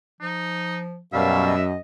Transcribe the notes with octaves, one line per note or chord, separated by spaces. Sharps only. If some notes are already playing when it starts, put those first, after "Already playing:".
F3 D#4
F#2 B2 G3 E5 F5
D#5